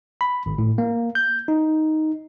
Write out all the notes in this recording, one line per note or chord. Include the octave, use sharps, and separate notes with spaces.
B5
G#1
A2
A#3
G6
D#4